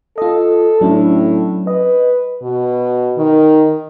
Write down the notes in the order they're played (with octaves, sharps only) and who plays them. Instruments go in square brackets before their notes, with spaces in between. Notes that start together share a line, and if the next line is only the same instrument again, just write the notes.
[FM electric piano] F4 D#5 [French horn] A4
[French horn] A2 [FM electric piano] F#3 C#4 D4
[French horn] B4 [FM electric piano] D#5
[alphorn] B2
D#3